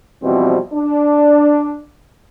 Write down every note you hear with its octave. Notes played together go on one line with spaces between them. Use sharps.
B2 E3 F3 G3 C4
D4